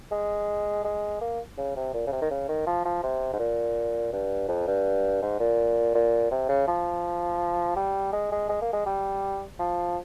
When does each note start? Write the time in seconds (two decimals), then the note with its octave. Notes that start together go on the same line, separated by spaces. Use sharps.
0.12 G#3
0.84 G#3
1.21 A#3
1.58 C#3
1.76 C3
1.94 A#2
2.07 C#3
2.12 C3
2.22 D#3
2.30 C#3
2.48 D#3
2.67 F3
2.85 F3
3.03 C3
3.33 G#2
3.39 A#2
4.13 G2
4.49 F2
4.67 G2
5.22 G#2
5.40 A#2
5.95 A#2
6.31 C3
6.49 C#3
6.68 F3
7.76 G3
8.13 G#3
8.32 G#3
8.49 G#3
8.62 A#3
8.73 G#3
8.86 G3
9.59 F3